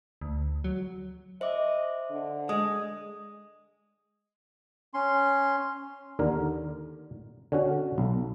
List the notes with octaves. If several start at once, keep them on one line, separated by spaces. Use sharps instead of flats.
D2
F#3
C5 D#5 E5 D6
D3
G#3 D#6
C#4 C6
D#2 D3 A#4
D3 C#4 F#4
B1